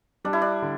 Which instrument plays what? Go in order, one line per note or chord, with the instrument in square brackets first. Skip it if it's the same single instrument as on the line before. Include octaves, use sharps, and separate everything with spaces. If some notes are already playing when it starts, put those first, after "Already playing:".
[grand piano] G3 [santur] D4
[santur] E4
D4
[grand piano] D3